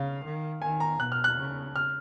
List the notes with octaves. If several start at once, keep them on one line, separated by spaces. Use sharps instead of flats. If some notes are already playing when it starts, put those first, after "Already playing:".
Already playing: C#3 F5
D#3
D#3 G#5
A#5
B2 F#6
F6
F#6
C#3
F6